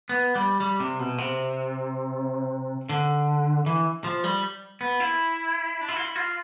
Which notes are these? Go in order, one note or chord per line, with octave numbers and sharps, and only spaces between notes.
B3
G3
G3
C3
B2
C3
D3
E3
F3
G3
B3
E4
D4
E4
F4
E4
F4